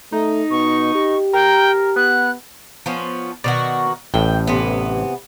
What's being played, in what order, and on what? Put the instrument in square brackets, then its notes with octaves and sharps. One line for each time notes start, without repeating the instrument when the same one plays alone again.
[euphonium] A3 [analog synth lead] D#4
[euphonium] B2 [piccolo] C#6
[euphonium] G4
[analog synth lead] A#4 [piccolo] G5
[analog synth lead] B3 [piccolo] F#6
[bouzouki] F3 B3 C#4
[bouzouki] B2 D#3 F#4 [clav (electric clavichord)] D5
[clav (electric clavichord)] A1 A2 [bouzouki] G5
[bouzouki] C3 E3 B3